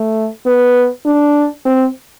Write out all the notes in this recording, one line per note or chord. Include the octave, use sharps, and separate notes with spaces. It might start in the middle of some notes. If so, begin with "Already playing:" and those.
Already playing: A3
B3
D4
C4